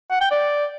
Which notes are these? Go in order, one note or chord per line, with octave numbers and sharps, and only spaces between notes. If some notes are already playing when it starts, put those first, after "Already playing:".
F#5
G5
D5